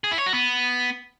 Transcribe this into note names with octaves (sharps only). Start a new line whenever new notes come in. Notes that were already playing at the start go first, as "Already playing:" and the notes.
G#4
E4
C#5
F#4
B3